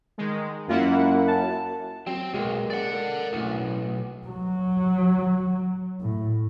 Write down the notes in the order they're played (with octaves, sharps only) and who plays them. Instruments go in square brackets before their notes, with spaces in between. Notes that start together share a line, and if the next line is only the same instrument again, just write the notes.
[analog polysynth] D#3 G#3
[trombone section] F#2 [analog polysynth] A#3 E4 F#5 [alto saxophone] F4
[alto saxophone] A5
[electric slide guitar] F#3 [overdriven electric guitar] C4
[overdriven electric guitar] B1 [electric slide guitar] G#3 A#3
[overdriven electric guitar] D5 F#5
[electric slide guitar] A4 A#4
[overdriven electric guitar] B1 [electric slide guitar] F#2 A2
[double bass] F#3
A2